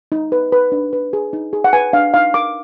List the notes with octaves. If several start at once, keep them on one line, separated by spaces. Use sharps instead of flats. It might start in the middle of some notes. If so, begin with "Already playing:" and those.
D#4
B4
B4
D4
B4
G#4
D#4
G#4
F#5
B4 G#5
D4 F5
D#4 F5
A#4 D6